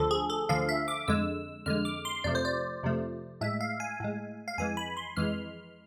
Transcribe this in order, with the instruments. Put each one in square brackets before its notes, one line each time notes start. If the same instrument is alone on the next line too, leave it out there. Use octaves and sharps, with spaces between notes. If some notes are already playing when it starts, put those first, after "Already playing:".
Already playing: [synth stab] D2 D3 F3 A4
G#4
A4
D2 D3 F3 F5
E5
D6
F2 D3 G#3 E6
F2 D3 G#3 F6
D6
C6
F2 C3 F3 A3 D5
C5
D5
F2 C3 F3 A3
A2 G#3 E5
F5
G#5
A2 G#3
F5
F2 E3 G#3 G#5
B5
C6
F2 E3 G#3 F6